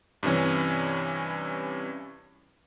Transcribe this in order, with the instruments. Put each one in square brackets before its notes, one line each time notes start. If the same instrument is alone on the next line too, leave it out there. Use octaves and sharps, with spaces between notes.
[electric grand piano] G2 C3 E3 C#4